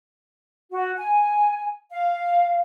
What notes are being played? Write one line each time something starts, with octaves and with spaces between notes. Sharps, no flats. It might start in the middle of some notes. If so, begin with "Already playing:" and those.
F#4
G#5
F5